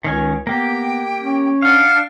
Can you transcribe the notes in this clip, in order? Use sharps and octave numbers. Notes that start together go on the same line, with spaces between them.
C#2 D#3 C#4 G#5
A#3 B3 G4 G5
C#4
D4 F5 F#5 F6